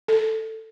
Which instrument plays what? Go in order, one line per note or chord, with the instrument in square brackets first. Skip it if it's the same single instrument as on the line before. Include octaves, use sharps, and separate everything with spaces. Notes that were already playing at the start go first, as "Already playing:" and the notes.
[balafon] A4